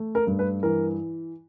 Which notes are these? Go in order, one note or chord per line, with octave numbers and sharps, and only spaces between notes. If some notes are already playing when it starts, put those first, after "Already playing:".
Already playing: A3
A#4
G2
B4
E3 A#4